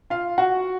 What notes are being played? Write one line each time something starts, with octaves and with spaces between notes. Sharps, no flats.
F4 F5
F#4 F#5